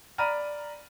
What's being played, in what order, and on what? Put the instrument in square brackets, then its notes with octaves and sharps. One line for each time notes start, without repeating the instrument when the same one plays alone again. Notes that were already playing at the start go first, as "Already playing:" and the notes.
[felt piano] D5 A#5 B5 F6 D#7